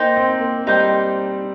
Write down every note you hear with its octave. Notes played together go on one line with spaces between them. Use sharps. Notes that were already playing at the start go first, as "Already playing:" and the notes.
Already playing: A#3 D#4 C5 G5
C4
A#3
G3 D#4 C5 G5